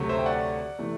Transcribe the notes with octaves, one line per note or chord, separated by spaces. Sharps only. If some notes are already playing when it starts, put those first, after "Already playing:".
Already playing: D2 C3 F#3 A3
C5 E5
G5
D5 F#5
C3 E3 A3